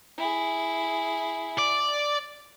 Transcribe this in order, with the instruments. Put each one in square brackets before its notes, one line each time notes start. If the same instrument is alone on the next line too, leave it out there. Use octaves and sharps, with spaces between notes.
[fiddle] E4 G#4
[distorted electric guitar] D5